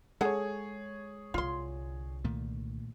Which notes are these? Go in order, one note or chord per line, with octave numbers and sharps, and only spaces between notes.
G#3 G#4 A4 C#5 F#5
C2 D3 F4 C6
A#2 D#3 A3